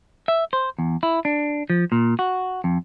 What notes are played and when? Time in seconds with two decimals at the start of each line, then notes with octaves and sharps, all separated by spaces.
0.28 E5
0.53 C5
0.79 E2
1.03 E4
1.25 D4
1.70 F3
1.92 A#2
2.19 F#4
2.64 F2